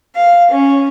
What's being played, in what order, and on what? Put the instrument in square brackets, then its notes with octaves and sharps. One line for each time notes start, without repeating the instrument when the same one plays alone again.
[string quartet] F5
C#4